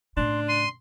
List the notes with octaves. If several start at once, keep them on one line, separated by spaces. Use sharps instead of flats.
A2 C#3 D4 C6
C6 D#7